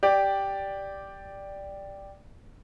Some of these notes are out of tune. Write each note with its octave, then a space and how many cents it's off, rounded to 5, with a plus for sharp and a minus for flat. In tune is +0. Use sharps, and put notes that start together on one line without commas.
G4 +0 D5 +0